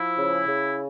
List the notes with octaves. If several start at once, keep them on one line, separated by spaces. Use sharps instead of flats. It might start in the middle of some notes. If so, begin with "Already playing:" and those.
Already playing: F3 E4
C#3
C#3